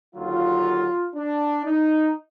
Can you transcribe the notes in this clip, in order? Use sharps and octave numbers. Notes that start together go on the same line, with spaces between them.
D#2 D3 F#3 F4
D4
D#4